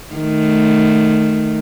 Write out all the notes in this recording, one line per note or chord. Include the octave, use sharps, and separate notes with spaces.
D#3 A3